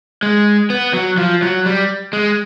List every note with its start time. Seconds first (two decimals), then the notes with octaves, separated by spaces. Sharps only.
0.23 G#3
0.70 B3
0.93 F#3
1.18 F3
1.42 F#3
1.66 G3
2.13 G#3